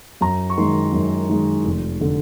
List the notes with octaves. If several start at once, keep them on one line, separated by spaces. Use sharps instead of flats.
F#2 A#5
C#6
D#3 G#3 C6
F#2
D#3 G#3
F1
D3